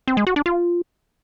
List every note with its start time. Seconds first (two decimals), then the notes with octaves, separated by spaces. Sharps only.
0.08 C4
0.17 G#3
0.27 F#4
0.36 D4
0.46 F4